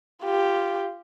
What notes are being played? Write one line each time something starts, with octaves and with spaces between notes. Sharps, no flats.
F4 G4